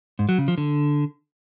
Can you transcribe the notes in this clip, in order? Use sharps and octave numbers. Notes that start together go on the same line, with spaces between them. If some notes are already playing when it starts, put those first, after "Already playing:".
G#2
F#3
C#3
F3
D3